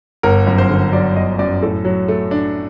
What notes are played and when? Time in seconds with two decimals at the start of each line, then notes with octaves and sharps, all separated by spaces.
0.23 G1 A#4
0.47 F#2
0.58 C5
0.70 D3
0.93 F#3 D5
1.16 G1 D#5
1.39 F#2 D5
1.62 A2 A4
1.85 F#3
2.08 A3
2.31 D4